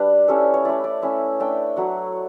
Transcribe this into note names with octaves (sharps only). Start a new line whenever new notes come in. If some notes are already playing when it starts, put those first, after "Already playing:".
Already playing: G3 D4 B4
G3 C#4 E4 A4
C#5
A3 E4 D5
D5
A3 C#4 E4 E5
A3 D4 G5
F#3 A3 E4 F#5